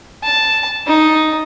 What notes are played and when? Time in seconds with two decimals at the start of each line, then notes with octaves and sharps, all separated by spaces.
0.24 A5
0.87 D#4